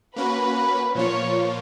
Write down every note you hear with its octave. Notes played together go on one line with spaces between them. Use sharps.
A#3 C#4 F#4 B4
A#2 F3 A#3 F4 C#5